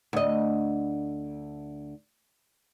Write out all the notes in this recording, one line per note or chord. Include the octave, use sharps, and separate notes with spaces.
D2 D#5